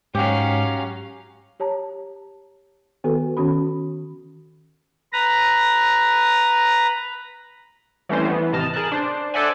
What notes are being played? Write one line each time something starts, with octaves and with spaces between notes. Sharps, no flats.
G#2 F#3 C#4 G4 F5
G4 C#5 A5 A#5
D#3 B3 F#4 A4 B4
D#3 C#4 F#4 B5
B4 A#5 A#6
E3 G3 A3 C4 C#4 C5
E3 B3
A1 C3 D#5 A5 F6
G#4 A#4 A5 F#6
D4 C5
A4 C5 D5 E5 F#5 G#5